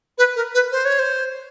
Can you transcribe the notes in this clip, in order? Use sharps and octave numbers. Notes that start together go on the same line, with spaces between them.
B4
A#4
B4
C5
C#5
C5